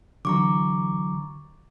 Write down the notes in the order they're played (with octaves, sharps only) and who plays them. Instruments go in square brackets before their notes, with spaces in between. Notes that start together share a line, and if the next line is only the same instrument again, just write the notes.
[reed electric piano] D3 E3 F#3 [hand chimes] A#5 C#6 D6